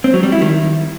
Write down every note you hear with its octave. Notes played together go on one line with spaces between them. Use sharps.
C4
F#3
G3
E4
D#3